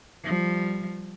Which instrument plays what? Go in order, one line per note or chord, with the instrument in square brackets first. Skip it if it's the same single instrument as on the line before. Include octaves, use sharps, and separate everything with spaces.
[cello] F3 G3